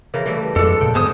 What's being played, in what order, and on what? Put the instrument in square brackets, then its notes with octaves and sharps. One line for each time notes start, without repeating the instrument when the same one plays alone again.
[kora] C#3 E3 A#4
E3 G3 A3
[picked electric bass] F2 F3 [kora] G#3 D4 [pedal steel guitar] A4
[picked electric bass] G2 A#2 C#3 [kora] G5
[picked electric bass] D2 G2 B3 [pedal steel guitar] G#3 C5 D#6